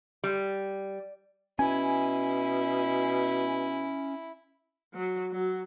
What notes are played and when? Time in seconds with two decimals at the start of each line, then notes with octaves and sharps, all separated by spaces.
0.24 G3
1.59 B2 C#4 E4 G#5
4.94 F#3
5.32 F#3